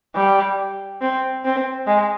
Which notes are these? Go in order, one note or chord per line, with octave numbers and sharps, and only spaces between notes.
G3
C4
C4
G#3